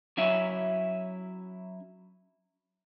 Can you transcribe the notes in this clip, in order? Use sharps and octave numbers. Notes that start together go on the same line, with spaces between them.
F#3 C#4 E4 E5